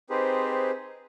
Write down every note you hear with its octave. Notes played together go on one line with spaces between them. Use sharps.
C4 D#4 G4 G#4 B4 C5